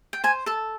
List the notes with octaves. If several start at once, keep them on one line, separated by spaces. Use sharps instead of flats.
G5
C5 G#5
A4 A5